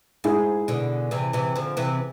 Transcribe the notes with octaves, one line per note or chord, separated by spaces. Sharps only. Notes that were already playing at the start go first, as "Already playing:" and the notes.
G#2 E4 G#4
B2 D3
C3 E3
C3 E3
D3 F3
C3 E3